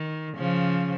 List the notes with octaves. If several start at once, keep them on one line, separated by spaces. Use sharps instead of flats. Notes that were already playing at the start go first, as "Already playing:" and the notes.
Already playing: D#3
C#3 F3